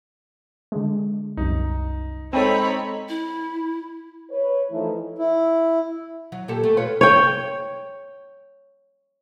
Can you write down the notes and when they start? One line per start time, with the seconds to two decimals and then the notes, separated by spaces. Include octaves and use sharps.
0.72 D3 G#3
1.37 C2 F#2 D#4
2.33 G#3 C4 D#4 A4 C#5 G5 B5 D#7
3.09 E4
4.31 B4 C#5
4.71 E3 F3 A3 D#4 E4 A4
5.18 E4
6.32 F#3
6.48 A#2 G4 A4
6.63 A3
6.77 F4 B4 C#5
7.01 C#5 G5